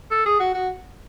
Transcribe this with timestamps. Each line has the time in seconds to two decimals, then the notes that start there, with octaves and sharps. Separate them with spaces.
0.11 A4
0.26 G#4
0.40 F#4
0.54 F#4